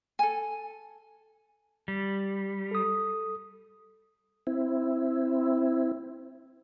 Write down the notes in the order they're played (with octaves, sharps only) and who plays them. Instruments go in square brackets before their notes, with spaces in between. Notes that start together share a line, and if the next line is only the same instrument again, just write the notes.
[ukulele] A4 G#5
[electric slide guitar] G3
[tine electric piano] A4 D#6
[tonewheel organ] C4 E4